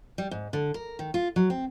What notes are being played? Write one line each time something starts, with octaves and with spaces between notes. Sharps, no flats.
G3
G#2
D3
A#4
D#3
F4
F#3
C4